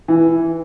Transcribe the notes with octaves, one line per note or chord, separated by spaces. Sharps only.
E3